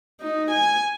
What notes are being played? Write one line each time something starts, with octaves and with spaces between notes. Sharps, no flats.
D#4
G#5